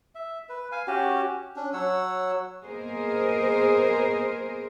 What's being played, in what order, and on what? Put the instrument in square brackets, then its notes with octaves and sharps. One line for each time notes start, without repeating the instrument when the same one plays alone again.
[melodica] E5
B4
F5 G#5
C#4 F#4 G4
C#4 D4
F#3 C#5 F#5 E6
[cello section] A#3 B3 G#4 A#4 C5 D#5